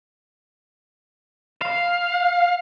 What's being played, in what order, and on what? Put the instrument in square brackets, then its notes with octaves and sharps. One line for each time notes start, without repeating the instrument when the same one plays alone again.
[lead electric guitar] F5